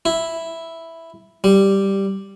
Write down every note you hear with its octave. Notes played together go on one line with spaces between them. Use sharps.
E4
G3